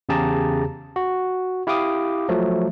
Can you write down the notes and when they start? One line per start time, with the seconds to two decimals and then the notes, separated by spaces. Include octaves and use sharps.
0.09 E2 C#3 G4 G#4 A5 A#5
0.96 F#4
1.67 E4 G4 F5 D6 D#6
2.29 F3 F#3 A3